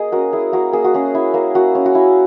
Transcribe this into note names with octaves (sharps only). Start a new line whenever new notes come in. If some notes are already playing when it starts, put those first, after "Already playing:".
Already playing: A#3 G#4 D#5
C#4 F#4 A#4
E4 G#4
A#3 F#4 A#4
A#3 G#4
F#4
C#4 G#4
E4
A#3
A#3 F#4
C#4
F#4
E4